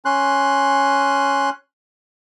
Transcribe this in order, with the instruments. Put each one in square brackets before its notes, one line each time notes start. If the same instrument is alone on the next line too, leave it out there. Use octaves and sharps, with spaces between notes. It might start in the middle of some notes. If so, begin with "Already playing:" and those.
[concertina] C#4 C6 F#6